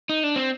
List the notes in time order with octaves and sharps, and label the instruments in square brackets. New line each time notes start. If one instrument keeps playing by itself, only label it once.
[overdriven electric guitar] D#4
D4
C4